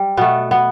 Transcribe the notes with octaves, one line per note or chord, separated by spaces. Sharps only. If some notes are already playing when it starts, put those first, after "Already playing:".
Already playing: G3
B2 A3 B3
B3